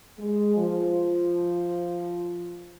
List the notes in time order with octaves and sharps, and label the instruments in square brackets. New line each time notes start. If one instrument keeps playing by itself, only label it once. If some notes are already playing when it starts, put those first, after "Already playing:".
[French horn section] G#3
F3